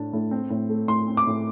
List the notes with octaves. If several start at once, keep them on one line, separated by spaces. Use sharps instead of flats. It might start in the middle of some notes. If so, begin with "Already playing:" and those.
Already playing: A2 A3 D4 A5
A2
C4
A2
A3
A2 C6
C4
D6
A2